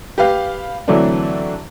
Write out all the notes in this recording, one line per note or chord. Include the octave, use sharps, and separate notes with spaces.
G4 B4 F5
D3 E3 F#3 A3 C4 D4